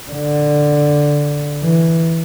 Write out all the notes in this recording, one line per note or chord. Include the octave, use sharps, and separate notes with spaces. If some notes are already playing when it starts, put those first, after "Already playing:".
D3
E3